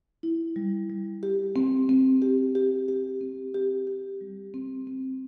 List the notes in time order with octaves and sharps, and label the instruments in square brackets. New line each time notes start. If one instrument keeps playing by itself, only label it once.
[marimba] E4
G3
G3
G4
C4
C4
G4
G4
G4
C4
G4
G4
G3
C4
C4